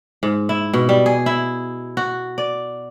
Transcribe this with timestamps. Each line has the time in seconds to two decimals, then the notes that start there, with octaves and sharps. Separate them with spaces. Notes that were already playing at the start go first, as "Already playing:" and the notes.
0.23 G#2
0.49 E4
0.73 B2
0.89 G3
1.06 G#4
1.26 E4
1.97 F#4
2.38 D5